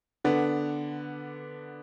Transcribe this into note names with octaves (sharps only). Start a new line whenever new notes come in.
D3 B3 D4